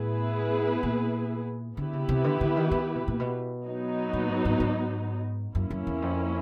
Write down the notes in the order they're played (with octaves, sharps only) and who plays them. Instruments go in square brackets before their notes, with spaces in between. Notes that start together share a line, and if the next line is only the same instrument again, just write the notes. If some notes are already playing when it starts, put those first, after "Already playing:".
Already playing: [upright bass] A2 [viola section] B3 E4 G#4 B4
[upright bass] A#2
[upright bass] D3 [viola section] B3 E4 G4 B4
[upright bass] C#3
C3
D3
D3
D#3
D#3
B2
A#2
B2
[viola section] F#3 B3 D#4
[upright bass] A#2
G#2
G#2
G#2
[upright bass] F#2 [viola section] A#3 C#4 E4
[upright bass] F#2
E2
F2